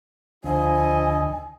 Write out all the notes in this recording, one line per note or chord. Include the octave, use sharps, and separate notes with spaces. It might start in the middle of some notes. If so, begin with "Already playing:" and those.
D2 D3 F3 E4 A4 D#5 G#5